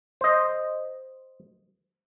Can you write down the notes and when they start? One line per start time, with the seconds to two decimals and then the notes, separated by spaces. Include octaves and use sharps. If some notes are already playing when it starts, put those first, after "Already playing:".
0.21 C5 D#5